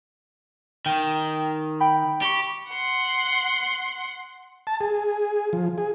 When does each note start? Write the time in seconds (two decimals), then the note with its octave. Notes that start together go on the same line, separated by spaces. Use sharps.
0.86 D#3 G5
1.80 G5 B5
2.22 G4 B5 C#6
2.69 F#5 C6
4.67 A5
4.81 G#4
5.53 F3
5.78 G#4